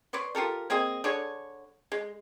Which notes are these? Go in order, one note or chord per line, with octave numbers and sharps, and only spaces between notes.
B4 C#5 D5 C6
F4 G4 A4 A#4
A#3 C4 G#4 D#5
D3 D4 G#4 C#5
G#3